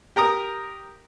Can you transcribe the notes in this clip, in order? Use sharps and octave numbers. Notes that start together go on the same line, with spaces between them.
G4 A#4 A#5 D#6